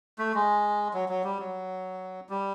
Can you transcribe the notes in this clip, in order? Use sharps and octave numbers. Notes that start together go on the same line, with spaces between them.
A3
G#3
F#3
F#3
G3
F#3
G3